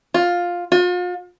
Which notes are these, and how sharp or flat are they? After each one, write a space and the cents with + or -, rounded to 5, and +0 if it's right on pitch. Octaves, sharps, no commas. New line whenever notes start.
F4 +10
F4 +40